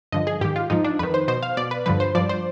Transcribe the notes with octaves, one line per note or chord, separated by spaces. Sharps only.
G2 D3 F3 D#5
G#4
G#2 D#3 G4
F4
G#2 F3 D#4
D4
F2 D#3 B4
C5
B2 C5
F5
B2 D5
B4
G2 D3 F3 B4
C5
G2 F3 D5
C5